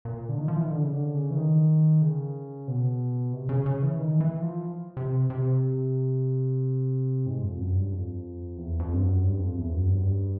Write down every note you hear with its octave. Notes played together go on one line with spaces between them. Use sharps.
A#2
D3
D#3
F3
E3
D#3
D3
C#3
D3
C#3
E3
D#3
C#3
B2
C3
C#3
C#3
E3
D#3
E3
F3
C3
C3
G#2
F2
F#2
G2
F2
E2
F2
G2
F#2
G2
F2
E2
F#2
G2
F#2
G2